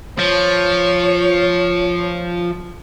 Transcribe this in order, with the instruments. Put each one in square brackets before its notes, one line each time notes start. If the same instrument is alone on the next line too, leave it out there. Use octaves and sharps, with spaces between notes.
[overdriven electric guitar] F3 [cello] C#5